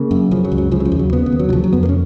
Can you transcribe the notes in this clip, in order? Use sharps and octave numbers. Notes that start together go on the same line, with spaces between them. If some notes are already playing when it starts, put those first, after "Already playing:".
Already playing: C#3 A#3
F#2
C#3 F3
F#3
C#2
F#3
C#3 F3
F#3
F3
D#2
F#3
C#3 B3
B3
D#2
F#3
D#3
C#3 F3
F#3
F2 B3
A#3
C#4